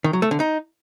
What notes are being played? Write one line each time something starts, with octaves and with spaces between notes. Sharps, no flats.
D#3
F#3
A3
D3
D#4